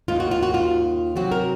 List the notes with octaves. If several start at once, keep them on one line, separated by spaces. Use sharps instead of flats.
D#2 D#3 A#3 F4
F#4
F4
F#4
F4
C3 F#3 C4 F#4
A#4